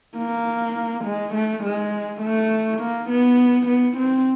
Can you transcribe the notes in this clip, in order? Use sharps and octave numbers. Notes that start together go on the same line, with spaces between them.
A#3
G#3
A3
G#3
A3
A#3
B3
B3
C4